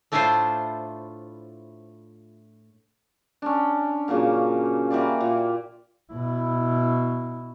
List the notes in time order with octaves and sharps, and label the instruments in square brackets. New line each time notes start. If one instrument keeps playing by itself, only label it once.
[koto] A2 A3 D4 E4 F4 C5
[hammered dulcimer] C#4 D4
A#2 C#3 F#3 A#3
E3 A#3 G4 D5
A#2
[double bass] B2 E4